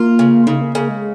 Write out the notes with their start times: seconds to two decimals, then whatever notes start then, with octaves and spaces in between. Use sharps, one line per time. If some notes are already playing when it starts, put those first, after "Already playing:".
Already playing: A#3 F4
0.19 C#3
0.47 C#3 D#4
0.61 A#3
0.75 C#3 A#3
0.89 G#3